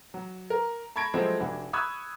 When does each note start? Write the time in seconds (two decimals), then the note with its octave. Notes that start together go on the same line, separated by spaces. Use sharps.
0.14 F#3
0.50 A#4
0.96 A5 B5 C#6 G#6 A#6 D7
1.14 F3 F#3 G#3 A3 C4 E4
1.40 F1 D4 E4 F#4
1.73 B5 C#6 D#6 E6 F#6 G#6